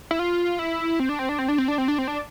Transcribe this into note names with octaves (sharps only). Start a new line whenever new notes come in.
E4
F4
E4
C4
D4
C4
D4
C4
D4
C4
D4
C4
D4
C4
D4